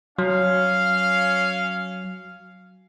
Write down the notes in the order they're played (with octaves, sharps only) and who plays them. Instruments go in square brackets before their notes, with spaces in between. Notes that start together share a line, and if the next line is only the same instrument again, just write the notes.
[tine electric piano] F#3 [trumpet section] C#4 F5